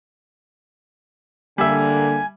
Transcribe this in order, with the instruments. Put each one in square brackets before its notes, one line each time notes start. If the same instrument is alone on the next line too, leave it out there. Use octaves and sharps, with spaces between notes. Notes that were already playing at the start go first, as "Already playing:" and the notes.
[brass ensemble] D3 A#3 [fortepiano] G3 E5 [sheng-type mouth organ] G#5